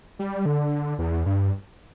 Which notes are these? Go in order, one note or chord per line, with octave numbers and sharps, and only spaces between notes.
G3
D3
E2
G2